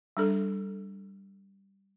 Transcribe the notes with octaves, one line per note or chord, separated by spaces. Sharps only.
G3 D4 A4